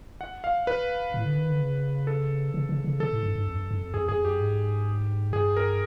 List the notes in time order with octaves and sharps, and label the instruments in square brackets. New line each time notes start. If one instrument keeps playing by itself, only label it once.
[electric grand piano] F#5
F5
B4
[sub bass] A2
D3
D#3
D3
C#3
[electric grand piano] A4
[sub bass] C#3
C#3
C#3
[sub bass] C3 [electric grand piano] A4
[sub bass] A2
G2
G2
F2
G2
F#2
F#2
F2
[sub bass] F2 [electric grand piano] G#4
[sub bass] F2 [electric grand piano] G#4
[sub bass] F#2 [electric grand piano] G4
[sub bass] G#2
[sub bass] G2 [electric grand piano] G#4
[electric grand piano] A#4